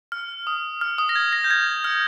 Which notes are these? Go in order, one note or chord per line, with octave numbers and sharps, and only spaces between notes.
F6
D#6
F6
D#6
A#6
G#6
A#6
G6
G#6
F6